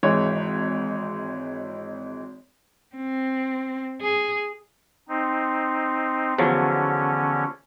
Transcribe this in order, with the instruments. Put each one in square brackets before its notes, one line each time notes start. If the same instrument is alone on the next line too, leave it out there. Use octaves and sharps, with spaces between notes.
[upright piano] G#1 E3 G#3 C#5
[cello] C4
G#4
[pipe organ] C4 D#4
[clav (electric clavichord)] E2 F3 F#3 [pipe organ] D3 C#4